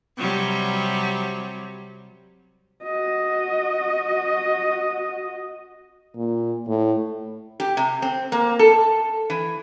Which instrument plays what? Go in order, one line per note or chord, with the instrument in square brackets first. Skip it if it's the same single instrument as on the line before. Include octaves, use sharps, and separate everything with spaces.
[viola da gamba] C3 F#3 G3
[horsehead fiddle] F#4 D#5
[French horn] A#2
A2
[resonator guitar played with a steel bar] G4
C3
C4
A#3
A4
E3